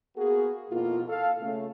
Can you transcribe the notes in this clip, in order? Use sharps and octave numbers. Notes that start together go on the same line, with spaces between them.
A#3 B3 F#4 G#4
F2 B2 A#3 E4 F4
A4 F5
C#3 A3